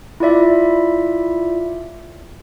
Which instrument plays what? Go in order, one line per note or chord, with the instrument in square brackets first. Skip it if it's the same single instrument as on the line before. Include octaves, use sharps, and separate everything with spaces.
[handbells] E4 F4 D5 E5